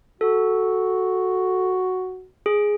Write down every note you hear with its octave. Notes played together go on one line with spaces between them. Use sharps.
F#4 A4
G#4